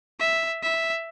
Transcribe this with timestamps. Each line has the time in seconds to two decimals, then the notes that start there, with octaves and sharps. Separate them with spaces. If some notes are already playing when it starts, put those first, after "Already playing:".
0.20 E5
0.63 E5